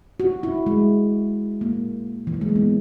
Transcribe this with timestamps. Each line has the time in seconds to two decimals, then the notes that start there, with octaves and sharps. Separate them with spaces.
0.20 F#4
0.43 E4
0.66 G#3
1.61 A#3
2.27 E3
2.34 F#3
2.41 G#3
2.49 A#3
2.56 B3